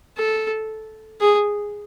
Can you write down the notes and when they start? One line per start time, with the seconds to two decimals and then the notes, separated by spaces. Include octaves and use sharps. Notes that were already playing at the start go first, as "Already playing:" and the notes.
0.18 A4
1.21 G#4